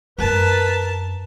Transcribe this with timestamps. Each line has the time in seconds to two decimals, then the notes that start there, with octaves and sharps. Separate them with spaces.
0.18 F#2 C4 A#4 B4 A5